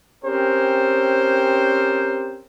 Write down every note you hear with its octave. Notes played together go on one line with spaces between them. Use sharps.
C4 C#4 G4 A#4 C5